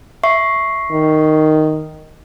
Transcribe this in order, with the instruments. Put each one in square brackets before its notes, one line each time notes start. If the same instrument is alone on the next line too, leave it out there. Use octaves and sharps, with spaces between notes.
[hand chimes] E5 C#6 C7
[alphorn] D#3